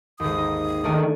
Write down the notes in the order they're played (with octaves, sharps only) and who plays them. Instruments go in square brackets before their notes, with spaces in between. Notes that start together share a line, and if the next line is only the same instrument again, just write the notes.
[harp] G#1 D#2 [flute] D#6
[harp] D#4
[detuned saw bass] D#3 [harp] A3 D4 G#5